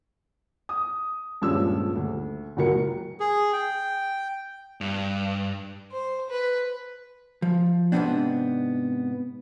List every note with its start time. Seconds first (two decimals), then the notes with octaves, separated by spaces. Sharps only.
0.69 D#6
1.41 D#1 G2 F3 G#3 C#4 E6
1.96 D2
2.57 F#1 C#2 F#4 A#4 C#7
3.20 G#4
3.53 G5
4.81 G2
5.92 C5
6.30 B4
7.42 F3
7.92 G#2 C3 F#3 B3 C4 D4